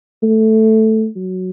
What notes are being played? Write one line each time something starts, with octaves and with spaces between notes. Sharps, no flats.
A3
F#3